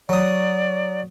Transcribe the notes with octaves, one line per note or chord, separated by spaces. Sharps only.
F#3 D5 D#6